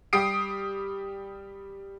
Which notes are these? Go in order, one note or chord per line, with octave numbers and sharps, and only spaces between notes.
G3 G4 D#6 C7 D7